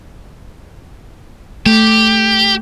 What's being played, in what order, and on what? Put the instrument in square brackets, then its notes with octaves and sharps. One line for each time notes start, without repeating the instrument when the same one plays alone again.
[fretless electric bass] A3 [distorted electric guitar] G4